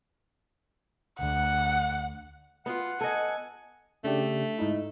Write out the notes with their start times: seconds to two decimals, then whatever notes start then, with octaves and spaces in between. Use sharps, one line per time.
1.19 D2 F#5
2.66 B3 F4 F#5
3.01 A4 D#5 G#5
4.04 C#3 A3 D4 G4
4.58 G#2 D#4 E4